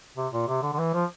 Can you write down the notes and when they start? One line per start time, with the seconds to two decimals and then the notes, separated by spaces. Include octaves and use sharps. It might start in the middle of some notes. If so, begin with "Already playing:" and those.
0.17 C3
0.33 A#2
0.48 C3
0.63 D3
0.73 D3
0.79 E3
0.94 F3